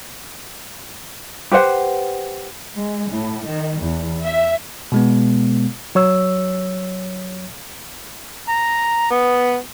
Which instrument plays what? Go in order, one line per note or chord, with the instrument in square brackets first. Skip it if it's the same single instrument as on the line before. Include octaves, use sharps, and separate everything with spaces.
[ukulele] G4 B4 C5 F#5
[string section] G#3
A2
D#3
E2
E5
[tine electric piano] B2 G#3 B3
[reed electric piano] F#3 C#5 E6
[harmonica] A#5
B3